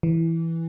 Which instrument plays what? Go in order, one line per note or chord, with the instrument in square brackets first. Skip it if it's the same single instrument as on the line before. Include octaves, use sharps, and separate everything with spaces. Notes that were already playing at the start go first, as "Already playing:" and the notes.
[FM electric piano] E3